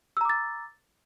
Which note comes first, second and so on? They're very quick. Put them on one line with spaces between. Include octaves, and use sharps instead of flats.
E6 A#5 D6 A6